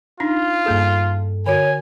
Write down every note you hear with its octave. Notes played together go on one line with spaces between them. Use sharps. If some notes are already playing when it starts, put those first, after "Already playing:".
D4 D#4 F4
G2 A#3 G#4 A4
D3 F#4 C#5 G#5